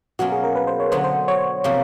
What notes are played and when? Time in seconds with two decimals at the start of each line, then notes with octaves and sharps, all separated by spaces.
0.19 B2 F#3 A#3 C#4 F4 F#4
0.32 G#4
0.44 A#4
0.56 B4
0.67 C5
0.80 C#5
0.92 D3 F#3 B3 C5
1.04 C5
1.28 C#5
1.64 C3 F3 A#3